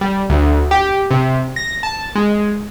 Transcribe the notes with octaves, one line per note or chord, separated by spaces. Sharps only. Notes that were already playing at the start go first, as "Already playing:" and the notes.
G3
D2
G4
C3
A#6
A5
G#3